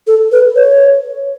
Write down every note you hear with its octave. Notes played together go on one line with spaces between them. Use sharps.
A4
B4
C#5